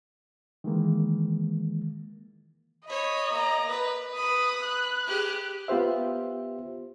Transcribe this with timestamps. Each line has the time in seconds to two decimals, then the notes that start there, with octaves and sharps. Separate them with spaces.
0.64 D#3 E3 G#3 A#3
2.87 C#5 D#5 B5
3.32 A#3 A#5
3.69 B4
4.16 B4 B5 D#6
4.64 F#6
5.07 G4 G#4
5.68 B3 F4 G4 C5 E5